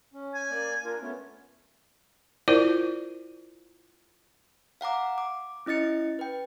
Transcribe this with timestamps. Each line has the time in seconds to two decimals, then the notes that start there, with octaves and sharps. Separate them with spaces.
0.13 C#4
0.34 G#5
0.50 A#3 D5
0.85 D4 F4 A#4
1.01 A3 B3 C#4
2.48 E4 F4 A#4 C5 D5
4.81 F5 F#5 A#5 D6
5.18 D6
5.66 C#4 E4 D#5 A6 C#7
6.19 B4 G5